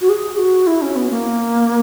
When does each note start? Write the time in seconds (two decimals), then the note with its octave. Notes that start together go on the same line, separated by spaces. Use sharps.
0.01 F#4
0.09 G#4
0.37 F#4
0.67 E4
0.82 C#4
0.96 B3
1.10 A#3